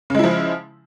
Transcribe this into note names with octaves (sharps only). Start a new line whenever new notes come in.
C#3 F3 G#3 E4